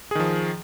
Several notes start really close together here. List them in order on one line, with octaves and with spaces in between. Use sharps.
G#4 D#3 F3